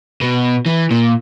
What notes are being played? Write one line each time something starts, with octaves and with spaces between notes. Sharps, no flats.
B2
E3
A#2